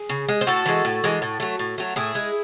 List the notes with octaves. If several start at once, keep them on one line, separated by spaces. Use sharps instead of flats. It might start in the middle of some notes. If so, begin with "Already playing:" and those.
Already playing: G#4
C#3
G#3
C5
A2 F#4 A4
E3 G#3
A2
E3 G#3
A2
F#3 A3
A2
F#3 A3
A2 E4 G#4
G#3